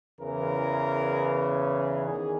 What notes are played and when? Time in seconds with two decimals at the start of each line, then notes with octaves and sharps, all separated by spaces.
0.19 E2 C#3 E3 A#4
2.05 E2 D#3 G#4